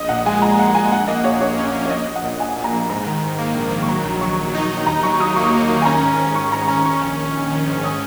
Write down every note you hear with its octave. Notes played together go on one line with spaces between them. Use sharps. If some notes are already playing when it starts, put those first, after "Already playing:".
Already playing: A#1 D#5
A#2 F#5
G#3 G#5
A#1 A#5
A#1 F#5
G#3 G#5
A#1 F#5
A#3 D#5
A#2 C#5
A#1 C#5
C#4
A#3
C#5
A#1 D#5
A#1
F#5
A#2
A#2 G#5
A#2
A#5
A#1
G#2 A#5
D#3
G#2
A#3
A#1
D#3
C#6
F#3 A#5
A#1
F#3 C#6
A#1
D#4
D#4
D#2 A#5
F#3 C#6
F#3 D#6
A#3 C#6
A#3
D#3
G#5
C#4 A#5
G#2
G#2
C#4 C#6
G#2 A#5
C#4 A#5
D#3 C#6
A#1
A#1
A#1
D#3
G#2
C#4 D#6